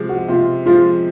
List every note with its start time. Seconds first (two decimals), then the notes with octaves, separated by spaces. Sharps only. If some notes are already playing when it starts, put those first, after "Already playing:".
Already playing: C3 F3 G#3
0.09 F#4
0.28 C3 F4
0.66 F3 G#3 F4